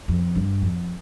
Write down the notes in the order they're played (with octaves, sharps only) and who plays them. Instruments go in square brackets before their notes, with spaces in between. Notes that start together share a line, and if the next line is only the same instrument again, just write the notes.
[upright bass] F2
G2
F2